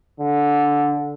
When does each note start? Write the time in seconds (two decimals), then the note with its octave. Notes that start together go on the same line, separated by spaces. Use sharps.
0.20 D3